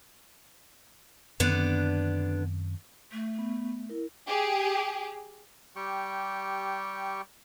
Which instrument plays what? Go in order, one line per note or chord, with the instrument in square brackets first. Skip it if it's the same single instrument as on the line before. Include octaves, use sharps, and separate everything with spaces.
[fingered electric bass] F#2 D#3 C4 [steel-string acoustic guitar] D3 B3 D4
[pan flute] A3
[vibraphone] B3
E4 A#4
[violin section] G4 G#4
[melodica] G3 G4 G5 C#6